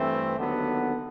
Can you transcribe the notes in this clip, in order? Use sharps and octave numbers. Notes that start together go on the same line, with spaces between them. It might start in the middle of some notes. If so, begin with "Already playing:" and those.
Already playing: G2 E3 A3 C4
D#2 D3 F#3 B3